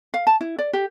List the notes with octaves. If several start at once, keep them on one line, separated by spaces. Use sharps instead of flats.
F5
A5
E4
D5
G4